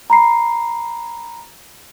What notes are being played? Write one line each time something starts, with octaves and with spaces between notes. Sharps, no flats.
A#5 B5 C7